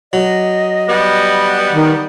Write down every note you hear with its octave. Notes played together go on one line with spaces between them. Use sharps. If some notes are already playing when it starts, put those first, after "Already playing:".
F#3 D#5
G3 B3
D#3